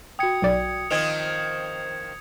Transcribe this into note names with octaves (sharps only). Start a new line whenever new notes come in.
F#4 G5 D#6 G#6 C#7
B1 D5
D#3 F3 C4 D#5 G#6 F7